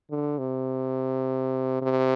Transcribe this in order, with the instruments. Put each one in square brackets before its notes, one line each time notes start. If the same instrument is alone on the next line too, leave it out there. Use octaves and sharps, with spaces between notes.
[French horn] D3
C3
C3